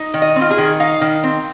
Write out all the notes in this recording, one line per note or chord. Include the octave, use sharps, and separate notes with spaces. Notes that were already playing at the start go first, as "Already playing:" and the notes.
Already playing: D#4
D#3
D#5
C4
F4
G#4
D#3
D#4 F5
D#3
C4